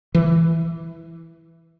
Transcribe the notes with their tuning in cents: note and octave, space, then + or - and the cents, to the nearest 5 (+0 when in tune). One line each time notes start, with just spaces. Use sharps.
E3 +0